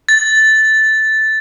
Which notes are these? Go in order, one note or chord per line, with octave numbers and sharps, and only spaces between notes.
A6